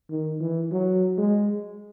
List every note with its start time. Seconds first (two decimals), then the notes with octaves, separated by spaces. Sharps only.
0.10 D#3
0.40 E3
0.71 F#3
1.18 G#3